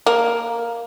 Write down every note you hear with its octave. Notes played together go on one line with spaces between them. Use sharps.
A#3